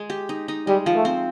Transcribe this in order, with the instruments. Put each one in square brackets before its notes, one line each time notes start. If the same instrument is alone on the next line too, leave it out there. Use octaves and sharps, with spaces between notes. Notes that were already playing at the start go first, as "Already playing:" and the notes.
Already playing: [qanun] G#3
G4
D#4
D#4
[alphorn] G3 [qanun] G#3
[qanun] F3
[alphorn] A3
[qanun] C4